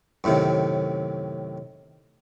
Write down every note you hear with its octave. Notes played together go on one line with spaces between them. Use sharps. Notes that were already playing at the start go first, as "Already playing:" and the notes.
F#2 A2 C3 D#3